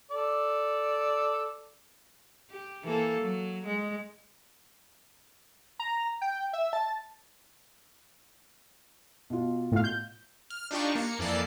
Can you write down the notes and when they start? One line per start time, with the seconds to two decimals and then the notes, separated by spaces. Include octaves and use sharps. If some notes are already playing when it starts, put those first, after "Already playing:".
0.11 A4 D5
2.50 G4
2.84 E3 A#3 A4
3.20 F#3
3.66 G#3
5.79 A#5
6.21 G5
6.53 E5
6.73 A5
9.30 B2 F4
9.72 A2 F5
9.84 G6
10.50 F6
10.71 D4 D#4 F4 G4 C#6
10.95 A#3 C#7
11.19 F2 E3 A#3 A4 D5 C7